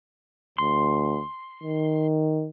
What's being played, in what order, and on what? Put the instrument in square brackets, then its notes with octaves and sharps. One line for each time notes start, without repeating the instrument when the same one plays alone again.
[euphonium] D2 [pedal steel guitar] C6
[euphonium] D#3